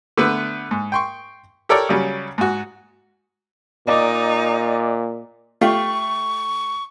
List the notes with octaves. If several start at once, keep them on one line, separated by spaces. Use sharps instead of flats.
D3 A3 B3 B4
G#2
G5 C6 C#6
G4 A4 A#4 C#5 D5
C#3 F#3 G3 C#4
G#2 F#4
A#2 D#4 D5 D#5 D6
A3 F4 G4 C#6